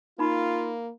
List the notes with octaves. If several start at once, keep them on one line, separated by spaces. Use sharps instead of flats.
A#3 D#4 F4 B5